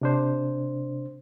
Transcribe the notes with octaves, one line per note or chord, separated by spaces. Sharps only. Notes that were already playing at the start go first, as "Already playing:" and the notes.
C3 D4 C5